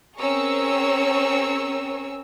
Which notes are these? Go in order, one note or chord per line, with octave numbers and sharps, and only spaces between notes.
C4 C#4 G#4 A#4 C#6 E6